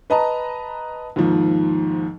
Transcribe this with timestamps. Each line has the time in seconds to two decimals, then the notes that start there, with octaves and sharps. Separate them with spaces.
0.10 B4 D#5 A5 A#5
1.16 D#2 G#2 F3